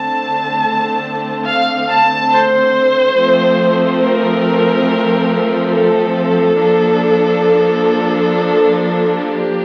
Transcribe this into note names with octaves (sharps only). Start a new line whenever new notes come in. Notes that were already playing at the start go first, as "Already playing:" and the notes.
Already playing: D3 A3 C4 A5
F5
A5
C5
F3 A3 C4
A#4
A4
F3 A#3 D4
G4